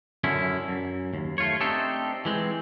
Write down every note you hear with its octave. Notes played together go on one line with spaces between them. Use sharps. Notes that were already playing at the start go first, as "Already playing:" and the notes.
F#2 D3 C#4 E4
F#2
D#2
A3 F4 C#5
A3 C4 D4 D#4 G4 A4
E3 G#3 C4